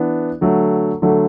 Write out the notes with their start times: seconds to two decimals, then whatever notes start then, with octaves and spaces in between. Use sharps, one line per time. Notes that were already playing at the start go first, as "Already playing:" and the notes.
Already playing: E3 B3 D4
0.41 D3 F#3 A3
1.02 D3 F#3 A3